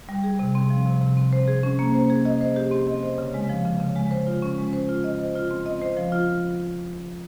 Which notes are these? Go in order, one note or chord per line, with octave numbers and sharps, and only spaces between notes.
G3
G#4
C3
C4
F3
C3
C3
C4
C5
G#4
C#4
A#3
C5
G#4
D#5
C5
G4
C4
D#5
C5
C#3
G#3
F3
C#3
C#3
G#3
C5
F4
C#4
G#3
C5
F4
D#5
C5
F4
C4
D#5
C5
F3
F4